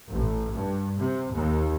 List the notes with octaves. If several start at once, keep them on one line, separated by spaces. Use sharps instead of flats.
A1
G2
C3
D#2